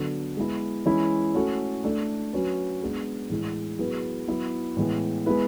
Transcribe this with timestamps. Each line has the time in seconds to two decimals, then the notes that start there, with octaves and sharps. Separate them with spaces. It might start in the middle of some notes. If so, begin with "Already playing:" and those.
Already playing: D3 F#3 B3 D4 A4
0.37 G#3 B3 E4
0.86 E3 G#3 C#4 E4
1.34 A3 C#4 F#4 A4
1.84 A3 D4 A4
2.33 F#3 C#4 F#4 B4
2.82 G#3 B3 D4 G#4 B4
3.30 A2 E3 G#3
3.79 F#3 B3 E4 G#4 B4
4.28 F#3 B3 E4
4.77 A2 E3 G#3 B3
5.26 G#3 B3 E4 B4